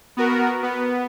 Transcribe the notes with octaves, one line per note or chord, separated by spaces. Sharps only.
B3 F#4 A#4
B3